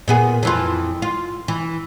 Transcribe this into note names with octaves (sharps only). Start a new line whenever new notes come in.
A#2 B3 G#4
F2 E3 F4
F4
E3